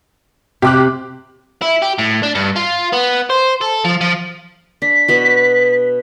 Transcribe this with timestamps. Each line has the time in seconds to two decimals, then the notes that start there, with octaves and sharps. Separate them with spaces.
0.62 C3 G4 D6 F#6
1.62 E4
1.82 G4
1.98 A2
2.23 D4
2.35 G2
2.56 F4
2.93 B3
3.30 C5
3.61 A4
3.85 F3
4.01 F3
4.82 D4 B6
5.08 B2 B3 F#4